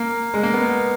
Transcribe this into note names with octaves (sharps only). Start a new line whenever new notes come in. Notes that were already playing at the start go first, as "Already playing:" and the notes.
Already playing: A#3
G#3
A#3
B3